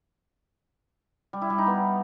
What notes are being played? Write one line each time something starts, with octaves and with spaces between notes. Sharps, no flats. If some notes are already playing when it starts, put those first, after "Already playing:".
G3
E4
G3
D#4
B3